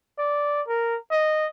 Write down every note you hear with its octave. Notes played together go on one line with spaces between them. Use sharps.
D5
A#4
D#5